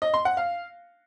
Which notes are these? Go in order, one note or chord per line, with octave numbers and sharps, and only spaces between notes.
D#5
C6
F#5
F5